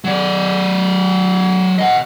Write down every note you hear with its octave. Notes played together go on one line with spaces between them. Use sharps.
F#3 D5
D#5 F#5